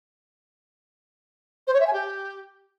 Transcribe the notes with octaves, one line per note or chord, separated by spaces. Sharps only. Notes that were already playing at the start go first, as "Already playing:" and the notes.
C5
C#5
E5
G#5
G4